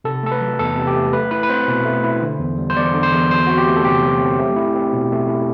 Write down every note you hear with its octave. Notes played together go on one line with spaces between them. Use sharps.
C3 A4
A3 A4
B4
F#3
E2 A4
C3
G4
A3
A3 B4
E4 B4
B4
C4 C5
B2
A3
E4
D3
E2
G3
C5
E2 D5
D3
C5
E2
F#3 C5
C4 F#4
G4
A3
A4
C3 G4
F#3
C4
A3
E4
C4
B2
A3
E4